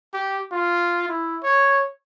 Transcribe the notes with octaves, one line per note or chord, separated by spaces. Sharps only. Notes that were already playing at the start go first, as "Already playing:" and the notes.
G4
F4
E4
C#5